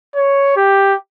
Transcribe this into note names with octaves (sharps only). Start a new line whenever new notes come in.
C#5
G4